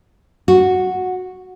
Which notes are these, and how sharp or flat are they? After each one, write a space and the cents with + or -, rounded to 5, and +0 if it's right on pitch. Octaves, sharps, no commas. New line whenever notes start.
F#4 -5